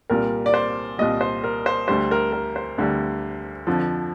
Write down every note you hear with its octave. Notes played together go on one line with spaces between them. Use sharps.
C2 A#2 G3 A#4
D5
C5
C2 A#2 G3 D#5
C5
A#4
C5
D2 D3 G3 C5
A#4
A#4
C5
D2 D3 G3
F2 D3 F3